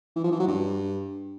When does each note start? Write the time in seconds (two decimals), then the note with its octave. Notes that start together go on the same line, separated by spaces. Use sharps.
0.16 E3
0.24 F3
0.32 E3
0.39 F#3
0.47 G2